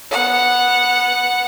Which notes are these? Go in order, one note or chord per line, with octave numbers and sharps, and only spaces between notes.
B3 F#5